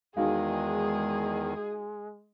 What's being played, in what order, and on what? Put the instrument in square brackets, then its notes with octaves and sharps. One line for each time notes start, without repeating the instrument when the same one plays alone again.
[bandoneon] E2 D#3 [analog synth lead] G#3 [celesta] D#4 F#4 F5 [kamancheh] G#4